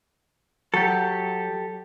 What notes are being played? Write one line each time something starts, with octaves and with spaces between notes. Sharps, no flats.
F#3 G4 A4